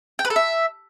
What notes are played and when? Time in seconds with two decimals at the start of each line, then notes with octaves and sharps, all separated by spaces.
0.19 G5
0.25 B4
0.30 A4
0.36 E5